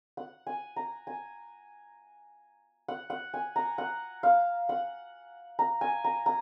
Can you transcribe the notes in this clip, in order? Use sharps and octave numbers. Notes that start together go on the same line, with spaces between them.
F#5
G#5
A#5
G#5
F#5
F#5
G#5
A#5
F#5
F5
F#5
A#5
G#5
A#5
A#5